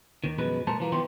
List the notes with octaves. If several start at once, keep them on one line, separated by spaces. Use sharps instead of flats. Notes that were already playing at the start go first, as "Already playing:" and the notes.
D#2 D#3
F#2 B2 F3 G#3 B4
A#2 G3 A3 A#4 C5 A5
E3 F3 A#3
D#3 F3 B3 E4 G4 C6